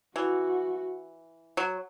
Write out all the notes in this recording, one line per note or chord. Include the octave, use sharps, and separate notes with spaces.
E3 F#4
F#3